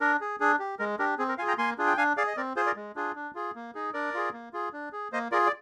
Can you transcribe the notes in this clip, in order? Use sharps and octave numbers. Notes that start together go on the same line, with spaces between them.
D4 A#4
G#4
D4 G#4
G4
G#3 A#4
D4 G4 A#4
C4 G#4
A#4
F4 G#4 F5 G#5
G5 A#5
A#3 G#5 C6
D4 F4 G#4
G5
D4 F5 G#5
G#4 D5 F5
D#5
C4 A#4 D5
F4 G#4 C5
A#4 D5
G#3
D4 F4 G#4
D4
F4 G#4
A#3
D#4 G#4
D4 A#4 D5
F4 G#4
A#3
F4 G#4
D4
G#4
A#3 C5 D#5
F4 G#4 A#4 D5
D5